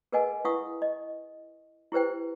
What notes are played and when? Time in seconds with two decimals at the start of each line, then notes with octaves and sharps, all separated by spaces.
0.12 G#4 A#4 B4 D#5 F#5 G#5
0.45 E4 B4 F5 F#5 C#6 D#6
0.82 D#5
1.92 E4 G4 B4 C5 G5